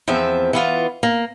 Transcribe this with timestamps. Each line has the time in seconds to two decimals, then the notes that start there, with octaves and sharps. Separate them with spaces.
0.08 E2 F3 C4 E5
0.53 E3 B3 F4
1.03 A#3